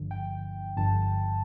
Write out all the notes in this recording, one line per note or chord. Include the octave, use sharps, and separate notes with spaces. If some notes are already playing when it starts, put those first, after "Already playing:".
Already playing: G1 G2 D3 F3
G5
G1 G2 D3 F3 A5